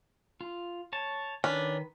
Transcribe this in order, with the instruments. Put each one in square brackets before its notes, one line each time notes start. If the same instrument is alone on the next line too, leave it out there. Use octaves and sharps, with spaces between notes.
[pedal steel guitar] F4
C#5 A5
[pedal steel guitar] D#3 B4 [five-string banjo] C#4 D4